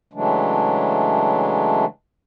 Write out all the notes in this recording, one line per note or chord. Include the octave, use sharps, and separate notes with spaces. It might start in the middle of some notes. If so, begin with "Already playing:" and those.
C#3 E3 F#3 G#3 A3 D4